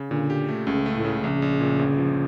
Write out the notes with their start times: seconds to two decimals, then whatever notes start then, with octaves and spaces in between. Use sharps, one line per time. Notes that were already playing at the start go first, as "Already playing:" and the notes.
Already playing: C#3
0.11 A#2 D3
0.30 G4
0.49 A3
0.67 C#2 C#3
0.86 A3
0.95 A2
1.05 C#3
1.24 A#1 C#3
1.42 A#1
1.61 A#2
1.79 G1
1.98 F3